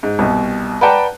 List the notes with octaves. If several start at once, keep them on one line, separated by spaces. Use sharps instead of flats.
G#2
C2 B2
B4 D5 F#5 G5 A5 A#5